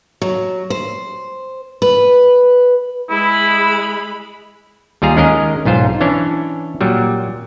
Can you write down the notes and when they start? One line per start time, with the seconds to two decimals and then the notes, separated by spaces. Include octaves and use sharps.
0.22 F#3
0.70 C5
1.82 B4
3.10 G#3 E4 B5
5.02 D#2 G3 F4 G#4 A#5
5.16 D#3 G#3 C#4 A#4 D#5
5.65 B1 G#2 F4 C5
6.01 E3 C#4 D4 C#5
6.81 A#2 F#3 G3